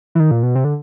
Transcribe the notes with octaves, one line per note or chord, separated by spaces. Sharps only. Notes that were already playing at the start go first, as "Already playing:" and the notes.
E3
D#3
A#2
B2
C3
D3